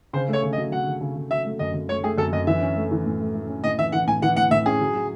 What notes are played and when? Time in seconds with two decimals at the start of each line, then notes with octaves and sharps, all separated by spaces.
0.13 C#3 C5
0.28 A3
0.33 C#5
0.43 C#3
0.53 D#5
0.58 F#3
0.72 F#3 F#5
0.87 C#3
1.01 C#3
1.16 C#3
1.31 F#3 E5
1.45 A3
1.59 F#2 D#5
1.74 F#2
1.89 A3 C#5
2.03 A3 G#4
2.18 F#2 A4
2.33 F#2 D#5
2.47 E3 E5
2.62 C#4
2.76 A3
2.91 E3
3.06 A2
3.20 A3
3.35 A3
3.49 C#4
3.64 A2 D#5
3.78 E3 E5
3.92 E3 F#5
4.07 A2 G#5
4.22 E3 F#5
4.36 A2 F#5
4.51 A2 E5
4.66 C#4 G#4
4.81 F#3
4.95 F#3